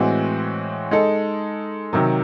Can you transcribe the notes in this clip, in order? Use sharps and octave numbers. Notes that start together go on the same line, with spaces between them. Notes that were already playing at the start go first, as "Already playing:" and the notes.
Already playing: A2 E3 G#3 C4 F#4
G#3 D#4 A4
C3 D#3 F#3